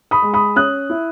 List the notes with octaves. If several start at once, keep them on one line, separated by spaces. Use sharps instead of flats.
B5 D#6
G#3
B5 D#6
C#4 D#6 F#6
E4